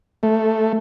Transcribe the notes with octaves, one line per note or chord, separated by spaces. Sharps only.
A3